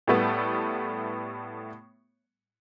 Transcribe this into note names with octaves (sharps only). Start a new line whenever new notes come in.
A2 G3 A3 B3